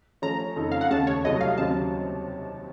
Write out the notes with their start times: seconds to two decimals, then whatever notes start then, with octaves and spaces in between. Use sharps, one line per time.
0.22 F3 A3 C#4 A#5
0.56 F2 C#3 A3 D#4 A4
0.71 F5
0.81 F#5
0.90 D#2 C#3 A3 C#4 A5
1.07 C#5
1.24 C2 C3 F#3 A3 D#5
1.41 F5
1.58 D#2 C#3 F#3 C4 A5